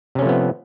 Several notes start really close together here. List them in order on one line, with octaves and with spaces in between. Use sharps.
C3 C#4 A3 F3 B3